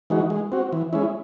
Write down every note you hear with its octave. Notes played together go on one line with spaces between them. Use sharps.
E3 G#3 D#4 F#4
G#3
C4 F#4
E3
G#3 C#4 E4